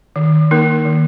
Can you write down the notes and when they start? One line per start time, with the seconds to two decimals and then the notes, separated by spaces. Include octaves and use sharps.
0.16 D#3
0.51 A#3 D#4 A#4
0.85 D#3